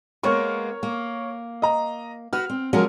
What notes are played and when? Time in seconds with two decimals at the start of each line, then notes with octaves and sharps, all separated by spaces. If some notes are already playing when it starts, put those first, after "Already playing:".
0.23 G#3 A#3 B3 A#4 C#5 C#6
0.83 A#3
1.62 D#5 A#5
2.33 F#4 B4 F6
2.50 C4
2.73 F3 F#3 G#3 C#4 A#4